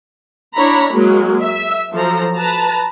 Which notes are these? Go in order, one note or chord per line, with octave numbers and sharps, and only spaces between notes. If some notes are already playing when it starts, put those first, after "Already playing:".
D4 E4 C#5 A#5 B5
F#3 G#3 A#3
E5
F3 F#3 A4 A#5
B4 A5 A#5